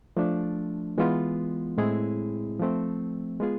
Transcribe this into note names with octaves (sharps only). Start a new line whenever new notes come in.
F3 A3 D4
E3 G#3 B3 F4
A2 G#3 C4 E4 G#4
F3 A3 C4
G#3 B3 F4 G#4